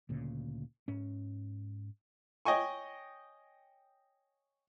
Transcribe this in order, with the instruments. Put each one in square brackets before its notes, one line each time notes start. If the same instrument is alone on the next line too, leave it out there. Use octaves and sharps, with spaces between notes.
[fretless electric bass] D2 A#2 C#3
G#2 C#4
[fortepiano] C#5 D#5 G5 G#5 C#6